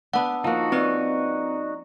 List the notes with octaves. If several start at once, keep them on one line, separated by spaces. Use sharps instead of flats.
B3 D4 F#5 A5 E6
F3 A#3 D#4 F#4
C4 C#4 B4 D5 D#5 C#6